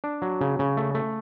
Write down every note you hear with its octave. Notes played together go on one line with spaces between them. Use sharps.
D4
F#3
C#3
C#3
A3
A3